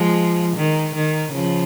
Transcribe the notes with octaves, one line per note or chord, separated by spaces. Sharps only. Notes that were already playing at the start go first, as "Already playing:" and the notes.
Already playing: F3 G#3
D#3
D#3
C#3 F3